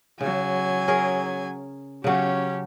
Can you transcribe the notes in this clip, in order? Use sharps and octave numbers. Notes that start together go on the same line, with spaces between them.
C#3 F#3 G#5
C#4 G#4 A#4
C#3 F#3 C#4 G4